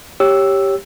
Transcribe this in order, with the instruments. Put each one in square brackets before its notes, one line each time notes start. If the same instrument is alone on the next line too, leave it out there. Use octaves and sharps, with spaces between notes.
[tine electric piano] G4 C#5 E6